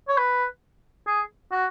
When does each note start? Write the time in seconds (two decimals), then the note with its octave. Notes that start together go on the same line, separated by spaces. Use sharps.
0.08 C#5
0.17 B4
1.07 G#4
1.52 F#4